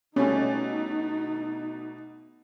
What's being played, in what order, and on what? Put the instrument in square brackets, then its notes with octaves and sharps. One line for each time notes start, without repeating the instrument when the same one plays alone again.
[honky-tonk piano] B2 [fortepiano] G3 A3 [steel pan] C#4 [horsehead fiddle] D#4